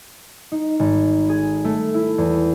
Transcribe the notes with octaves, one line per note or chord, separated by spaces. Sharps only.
D#4
G#1
G#4
A3
E4
E2